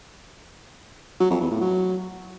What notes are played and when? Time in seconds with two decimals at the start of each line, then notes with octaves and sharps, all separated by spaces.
1.20 F#3
1.30 F2
1.40 E2
1.51 A2
1.61 F#3